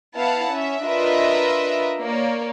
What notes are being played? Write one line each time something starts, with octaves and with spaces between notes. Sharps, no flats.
B3 E4 F5 F#5 A5
C#4 E5
D4 F4 A#4 B4 D#5 E5
A#3 C#5 D5